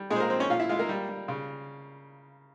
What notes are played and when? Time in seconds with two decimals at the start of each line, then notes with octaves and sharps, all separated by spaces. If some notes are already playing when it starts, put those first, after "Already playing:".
Already playing: G3
0.10 A#2 G#3 G#4
0.16 C5
0.20 A#3 A#4
0.30 F3 C4 C5
0.40 C#4 C#5
0.50 A#2 F4 F5
0.60 E4 E5
0.69 G#3 F4 F5
0.79 A#3 A#4
0.89 G3
1.09 G3
1.28 C#3